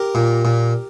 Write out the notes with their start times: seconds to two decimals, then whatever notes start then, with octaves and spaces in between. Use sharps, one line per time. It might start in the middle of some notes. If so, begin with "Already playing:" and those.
Already playing: G4 A#4
0.15 A#2
0.45 A#2